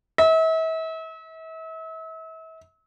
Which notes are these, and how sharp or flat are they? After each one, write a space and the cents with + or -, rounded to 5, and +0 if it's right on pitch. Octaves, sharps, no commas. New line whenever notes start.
E5 -40